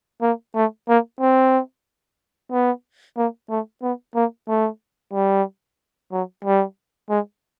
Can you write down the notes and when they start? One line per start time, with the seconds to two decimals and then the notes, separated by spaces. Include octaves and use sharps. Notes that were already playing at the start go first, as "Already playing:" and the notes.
0.22 A#3
0.55 A3
0.89 A#3
1.21 C4
2.52 B3
3.17 A#3
3.50 A3
3.82 B3
4.15 A#3
4.49 A3
5.13 G3
6.12 F#3
6.44 G3
7.10 G#3